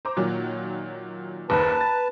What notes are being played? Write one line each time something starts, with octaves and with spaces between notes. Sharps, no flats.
C5 A#5 D6
A#2 D#3 F#3
F#1 D#2 D#3 B4 A5
A#5 A6